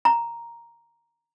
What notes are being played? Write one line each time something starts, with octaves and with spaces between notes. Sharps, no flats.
A#5